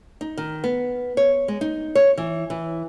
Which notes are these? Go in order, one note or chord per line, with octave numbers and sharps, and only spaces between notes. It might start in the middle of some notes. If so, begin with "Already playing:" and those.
D#4
D#3
B3
C#5
G#3
D#4
C#5
E3
E3